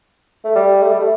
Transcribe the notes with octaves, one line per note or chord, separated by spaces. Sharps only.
A3
G3
A3
G3
A3